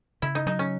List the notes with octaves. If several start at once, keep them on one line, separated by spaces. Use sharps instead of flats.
C#3 E4
D#4
F#3 D#4
C#4